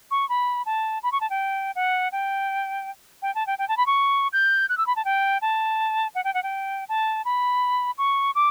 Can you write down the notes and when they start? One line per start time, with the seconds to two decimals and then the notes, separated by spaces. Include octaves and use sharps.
0.11 C#6
0.29 B5
0.66 A5
1.03 B5
1.12 C#6
1.21 A5
1.30 G5
1.75 F#5
2.12 G5
3.22 G5
3.35 A5
3.47 G5
3.59 G5
3.69 A5
3.77 B5
3.86 C#6
4.33 G6
4.69 F#6
4.78 E6
4.87 B5
4.96 A5
5.05 G5
5.42 A5
6.15 F#5
6.24 G5
6.34 F#5
6.43 G5
6.89 A5
7.25 B5
7.98 C#6
8.35 D6